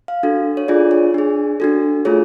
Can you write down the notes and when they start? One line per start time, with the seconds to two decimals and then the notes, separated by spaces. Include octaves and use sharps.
0.08 F5
0.23 D4 F#4 A4
0.57 C#5
0.68 D4 F4 G#4 D5
0.91 C#5
1.14 D4 G#4
1.60 D4 F#4 A4
2.05 A3 F4 G#4 C#5